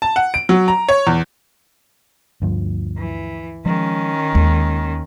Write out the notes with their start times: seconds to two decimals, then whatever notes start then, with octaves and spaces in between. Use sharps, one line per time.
0.02 A5
0.16 F#5
0.34 D7
0.49 F#3
0.68 A#5
0.89 C#5
1.07 E2
2.42 D2 G2 F3
2.97 E3
3.66 D#3 F3 G#3 C#4
4.35 D#2 G#3